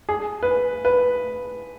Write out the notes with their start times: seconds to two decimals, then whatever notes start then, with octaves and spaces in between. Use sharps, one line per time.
0.09 G#4
0.43 B4
0.85 B4